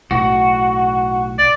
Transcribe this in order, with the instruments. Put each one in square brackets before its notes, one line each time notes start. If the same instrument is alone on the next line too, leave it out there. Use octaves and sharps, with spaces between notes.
[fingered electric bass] B1 A2 [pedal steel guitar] F#4
[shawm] D5